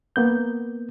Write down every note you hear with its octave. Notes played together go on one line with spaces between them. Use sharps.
A#3 B3 G6